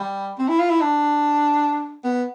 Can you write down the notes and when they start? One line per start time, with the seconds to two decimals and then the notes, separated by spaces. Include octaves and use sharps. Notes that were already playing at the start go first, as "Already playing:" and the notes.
Already playing: G3
0.38 C4
0.48 E4
0.59 F4
0.69 E4
0.81 D4
2.04 B3